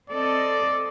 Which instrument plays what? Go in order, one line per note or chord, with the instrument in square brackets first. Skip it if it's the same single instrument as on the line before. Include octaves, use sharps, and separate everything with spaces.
[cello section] C4 A4 D#5 [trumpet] D5